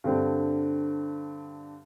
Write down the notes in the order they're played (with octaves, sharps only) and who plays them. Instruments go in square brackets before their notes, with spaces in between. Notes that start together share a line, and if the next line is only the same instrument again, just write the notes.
[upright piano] G2 D3 C4